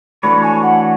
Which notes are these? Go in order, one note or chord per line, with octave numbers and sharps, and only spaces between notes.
E3 A3 D4 F#4 C#5 B5
G#5
F#5